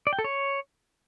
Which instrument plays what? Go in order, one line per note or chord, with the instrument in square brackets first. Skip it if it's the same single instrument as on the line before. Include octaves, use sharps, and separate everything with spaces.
[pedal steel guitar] D5
G5
A4
C#5